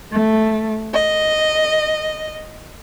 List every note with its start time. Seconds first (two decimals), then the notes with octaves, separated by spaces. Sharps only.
0.12 A3
0.93 D#5